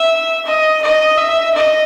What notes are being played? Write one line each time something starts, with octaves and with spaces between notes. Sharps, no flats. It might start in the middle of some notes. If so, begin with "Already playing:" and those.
Already playing: E5
D#5
D#5
E5
D#5